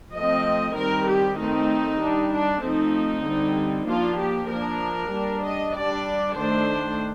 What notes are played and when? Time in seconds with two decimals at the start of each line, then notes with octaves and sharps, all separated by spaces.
0.14 F3 A3 C4 D#5
0.76 D#3 G3 C4 A#4
1.07 G4
1.39 D#3 A3 C4 D#4
2.00 G3 D4
2.32 D4
2.62 F3 A3 C4 D#4
3.25 D3 G3 C4
3.87 F3 A#3 D4 F4
4.18 G4
4.49 F3 A#3 D4 A#4
5.12 G3 D4
5.42 D#5
5.74 G3 D4 D5
6.35 D#3 A3 D4 C5